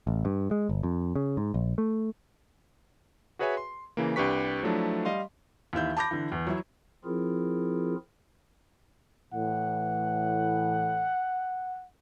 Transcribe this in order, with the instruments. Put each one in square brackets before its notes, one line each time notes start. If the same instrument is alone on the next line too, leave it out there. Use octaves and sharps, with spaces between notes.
[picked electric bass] A1
G2
G#3
G1
F2
C#3
G#2
A#1
A3
[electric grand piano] F#4 G#4 B4 C#5 E5 G#5
C6
C#3 E3 A#3
C2 D4 G4 B4 C#6 B6
F3 F#3 A3 D4 E4
G3 D#5 F5 C6
[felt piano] D#2 E3 E5 G6
A5 B5 D6 G6 A#6
D3 E3
E2
F#3 E4
[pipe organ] F3 C4 E4 F4 G#4 A#4
[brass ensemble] A2 E3 [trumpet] F#5